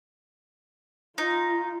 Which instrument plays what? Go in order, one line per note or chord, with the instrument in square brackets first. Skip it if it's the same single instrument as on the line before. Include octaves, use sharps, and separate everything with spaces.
[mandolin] D#4 [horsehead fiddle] F4